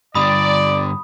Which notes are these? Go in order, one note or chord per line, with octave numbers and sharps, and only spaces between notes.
G2 D3 D5 B5 D#6